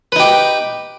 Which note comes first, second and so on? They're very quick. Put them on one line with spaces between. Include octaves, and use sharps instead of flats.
B4 D#4 G4